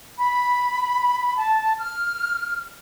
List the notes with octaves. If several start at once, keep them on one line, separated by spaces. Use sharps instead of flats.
B5
A5
F6